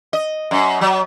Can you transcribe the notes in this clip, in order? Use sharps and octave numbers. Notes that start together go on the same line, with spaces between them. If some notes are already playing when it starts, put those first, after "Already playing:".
D#5
F#2
F#3